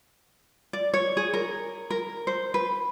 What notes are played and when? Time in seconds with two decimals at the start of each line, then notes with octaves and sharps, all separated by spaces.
0.73 D5
0.94 C#5
1.17 G#4
1.34 A#4
1.90 A#4
2.27 C5
2.54 B4